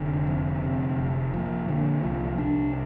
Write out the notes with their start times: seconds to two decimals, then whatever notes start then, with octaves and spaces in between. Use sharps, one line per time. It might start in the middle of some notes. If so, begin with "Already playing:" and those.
Already playing: F1 D3
0.27 F2
0.63 C3
0.98 F1
1.33 A#2 F3
1.69 A#2 D3
2.03 C2 F3
2.38 C2 D4